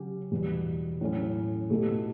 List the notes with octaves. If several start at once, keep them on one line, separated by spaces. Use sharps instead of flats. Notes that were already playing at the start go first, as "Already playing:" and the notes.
Already playing: C#3 F#3 C#4 G4
E2 B2 G3
A2 F#3 C#4
B2 A3 E4 G4